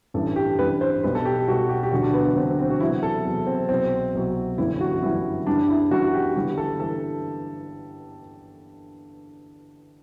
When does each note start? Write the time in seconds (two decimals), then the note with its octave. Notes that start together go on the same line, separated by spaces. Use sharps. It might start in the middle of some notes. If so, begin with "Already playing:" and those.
0.14 A1 G2 E3 G3 A4
0.36 G4
0.58 A1 G2 E3 G3 B4
0.81 C5
1.03 B1 B2 G3 B4
1.15 A4
1.25 G4
1.48 B1 B2 G3 F#4
1.69 G4
1.83 G4
1.91 E1 D2 D3 F#3 F#4
2.02 D4
2.14 B3
2.25 B3
2.36 E1 D2 D3 F#3 C4
2.59 C4
2.70 F#4
2.80 E2 C3 F#3 E4
3.03 A4
3.25 E2 C3 F#3
3.47 C4
3.69 C2 B2 F#3 C4
4.14 C2 B2 F#3
4.58 G1 F#2 E3 G3 E4
4.81 F#4
5.02 G1 F#2 E3 G3 E4
5.47 F#1 F#2 E3 G3 D4
5.68 E4
5.91 F#1 F#2 E3 G3 F#4
6.13 G4
6.35 G1 G2 E3 G3 G4
6.58 A4
6.80 E3 G3 A4